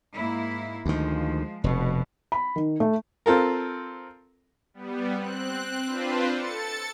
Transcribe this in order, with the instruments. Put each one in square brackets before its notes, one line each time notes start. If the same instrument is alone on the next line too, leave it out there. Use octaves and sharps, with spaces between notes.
[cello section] G#2 A#3 E4
[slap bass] D2 D#3 [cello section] F3 G#3
[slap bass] F1 [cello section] B2
[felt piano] B5
D#3
A3
[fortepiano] C4 F4 A4 A#4
[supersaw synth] G3 B3
C4 F#6
C4 D4 F4 B4 C5
A4 A6 C#7